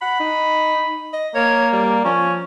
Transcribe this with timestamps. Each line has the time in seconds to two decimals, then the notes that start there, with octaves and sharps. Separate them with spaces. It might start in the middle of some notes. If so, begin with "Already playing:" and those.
0.02 F#5 B5
0.20 D#4
1.13 D#5
1.35 A#3 A#4 C#5
1.73 G3 D5
2.05 F3 C#4